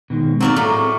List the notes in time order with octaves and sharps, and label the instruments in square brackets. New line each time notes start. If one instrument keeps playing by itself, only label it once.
[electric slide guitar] B2 D#3 G#3
[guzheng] F#3 A#3 D5 [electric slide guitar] C4 D#4 A#5
[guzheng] A2 [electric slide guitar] G#4